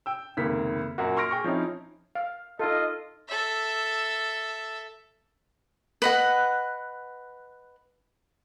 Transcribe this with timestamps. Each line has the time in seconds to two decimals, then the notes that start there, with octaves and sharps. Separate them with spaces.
0.06 G5 E6
0.37 F1 C#2 D#3 A#3 B6
0.98 F#2 A#2 A#3 F#4
1.17 C6 C#6 F6 A#6 D7
1.31 G#4 G5 C#6
1.44 F3 C4 C#4 D#4 E4
2.15 F5
2.59 D#4 F4 A4 D#5
3.28 A4 E5
6.02 B4 D#5 F#5